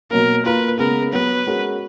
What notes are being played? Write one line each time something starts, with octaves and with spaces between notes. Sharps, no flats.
B2 F#3 A#3 A#4
A#3 F4 A#4 B4
C#3 G#3 B3 A#4
F#3 B3 F#4 B4
G#3 C#4 F#4 A#4